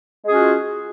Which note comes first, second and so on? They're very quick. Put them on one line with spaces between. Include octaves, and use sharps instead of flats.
G#3 G#4 C#4 F#4 F4